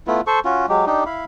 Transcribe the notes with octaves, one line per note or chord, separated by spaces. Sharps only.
A3 B3 E4 F4
A4 C5 C#6
C#4 F4 F#4
F#3 G#3 G4
D4 D#4 G4
E4 F5 B5